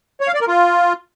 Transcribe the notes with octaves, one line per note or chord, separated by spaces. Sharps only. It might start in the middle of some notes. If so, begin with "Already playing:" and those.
C#5
F5
D5
A#4
F4